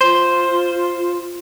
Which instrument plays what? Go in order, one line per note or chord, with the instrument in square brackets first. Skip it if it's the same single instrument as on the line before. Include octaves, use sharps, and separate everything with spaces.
[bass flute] F4 [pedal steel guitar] C5